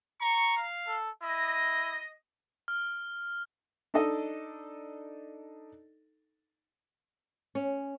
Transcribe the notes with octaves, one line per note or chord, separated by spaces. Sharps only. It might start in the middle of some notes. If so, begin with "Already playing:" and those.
A#5 C#6
F5
A4
E4 D#5
F6
D4 D#4 A4 D#5
C#4